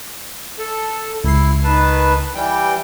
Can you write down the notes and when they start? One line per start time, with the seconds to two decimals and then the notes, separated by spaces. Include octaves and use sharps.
0.59 A4
1.24 C#2 E4 C7
1.64 D#3 B4 A5
2.35 E3 G3 G5